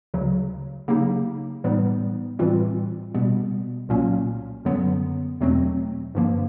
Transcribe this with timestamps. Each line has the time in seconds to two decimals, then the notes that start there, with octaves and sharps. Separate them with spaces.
0.14 D2 C#3 F#3
0.88 C#3 F#3 A#3 D#4 G4
1.64 A2 E3 G3 B3 D#4
2.39 A2 E3 G3 C4 F4
3.14 B2 G3 B3
3.89 C2 A#2 F#3 A#3 C#4
4.65 F#2 D3 F#3 B3
5.41 E2 B2 F#3 A3 C4
6.15 G2 D3 F3 A#3